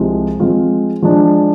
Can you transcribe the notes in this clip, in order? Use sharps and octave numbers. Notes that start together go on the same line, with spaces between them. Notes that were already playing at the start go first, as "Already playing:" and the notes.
Already playing: C2 C3 F3 G#3
F3 G#3 C4 F4
F3 G#3 D4